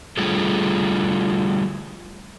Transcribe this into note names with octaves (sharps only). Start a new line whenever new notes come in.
D3 G3 A3 F4 G#4 A4